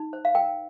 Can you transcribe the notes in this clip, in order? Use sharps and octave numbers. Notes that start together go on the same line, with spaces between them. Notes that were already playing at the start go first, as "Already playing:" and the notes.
Already playing: D#4
C5
F5
A#4 G5